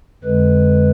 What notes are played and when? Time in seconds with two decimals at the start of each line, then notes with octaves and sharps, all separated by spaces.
0.24 F2 D3 G#3 B4